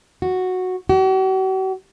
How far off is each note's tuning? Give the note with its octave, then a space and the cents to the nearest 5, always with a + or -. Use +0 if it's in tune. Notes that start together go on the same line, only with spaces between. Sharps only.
F#4 -5
F#4 +45